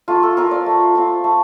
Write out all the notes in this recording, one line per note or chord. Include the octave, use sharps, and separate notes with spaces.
A3 F4
A4
C4 F4 A#4
D5
A3
C4 F4
A3